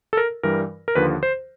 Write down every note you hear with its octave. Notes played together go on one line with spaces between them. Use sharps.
A4
A#4
G2 E3 G3 A#4
A#4
D#2 D3 F3 B4
C5